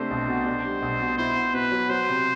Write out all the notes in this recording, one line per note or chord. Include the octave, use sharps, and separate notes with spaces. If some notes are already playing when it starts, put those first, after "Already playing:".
Already playing: C3 A3 D4 C5
B1
B2
D4
G3
B1
B2
E4 C5
B3
B2 B4
F#3
F#3 C5
C3